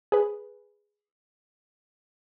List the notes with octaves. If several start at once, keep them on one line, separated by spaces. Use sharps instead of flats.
G#4 B4